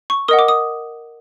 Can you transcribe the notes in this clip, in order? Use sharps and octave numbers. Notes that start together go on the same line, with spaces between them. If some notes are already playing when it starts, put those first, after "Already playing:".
C#6
A#4 D#5 F#5 D#6
D6
D#6